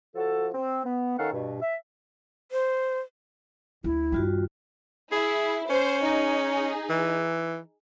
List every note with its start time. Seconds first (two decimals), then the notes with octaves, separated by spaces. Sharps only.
0.15 F3 F#4 A4
0.54 C4
0.85 B3
1.18 D#3 C#4 A4 F5 F#5
1.33 G2 B2
1.62 E5
2.52 C5
3.84 D2 E4
4.12 G2 D#3 G3 F4 F#4
5.12 E4 G#4
5.70 C#4 C5
6.03 D#4 G#4
6.90 E3